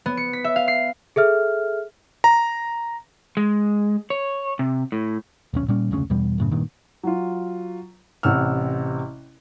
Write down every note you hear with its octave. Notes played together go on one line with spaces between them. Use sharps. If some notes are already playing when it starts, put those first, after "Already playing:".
B3
C#7
B6
E5
F5
C7
G#4 A4 E5 F6
A#5
G#3
C#5
C3
A2
D#1 B1 C#4
A#2 G3 C#4
F1 D2 C#3 C#4
E2 B2 G3
F#2 A2 C#3
G2 A#2 D#3
F#3 F4
A1 C3 F#5 E6 F6